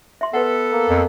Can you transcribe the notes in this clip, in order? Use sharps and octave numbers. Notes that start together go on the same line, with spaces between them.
E5 C6
B3 A4 B4 F#5
A#3
F2